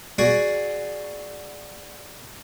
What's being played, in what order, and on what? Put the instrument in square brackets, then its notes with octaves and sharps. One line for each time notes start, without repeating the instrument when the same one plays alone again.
[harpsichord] F#4 G#4 D5 F#5 C#6